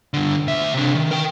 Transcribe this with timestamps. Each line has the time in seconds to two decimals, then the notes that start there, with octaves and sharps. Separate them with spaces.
0.14 G2 D3
0.47 D2 E5
0.74 C3 D4
0.95 D#3
1.11 A#4 G5